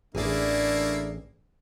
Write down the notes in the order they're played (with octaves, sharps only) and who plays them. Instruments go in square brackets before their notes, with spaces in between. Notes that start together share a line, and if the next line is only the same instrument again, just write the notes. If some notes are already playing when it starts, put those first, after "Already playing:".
[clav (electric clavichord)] A1 [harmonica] A3 A#3 E4 [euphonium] D4 [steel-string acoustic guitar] G#4 D5